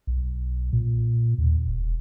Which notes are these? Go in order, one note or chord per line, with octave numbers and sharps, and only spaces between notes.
B1
A#2
D#2
E1